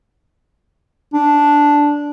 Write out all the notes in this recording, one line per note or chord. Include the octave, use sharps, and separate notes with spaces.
D4